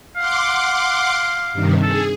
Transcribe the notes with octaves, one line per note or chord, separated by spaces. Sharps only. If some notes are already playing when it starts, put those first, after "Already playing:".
F5 F#5 C6 D6
G2 C3 D#3
G#4 A4